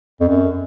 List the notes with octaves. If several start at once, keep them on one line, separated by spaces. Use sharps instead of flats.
F2
F#2